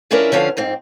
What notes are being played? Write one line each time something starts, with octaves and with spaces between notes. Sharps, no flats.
F3 C#4 D4 E4 A#4 B4
D3 F3 C#4 D4 C#5 F5
F2 G#2 C4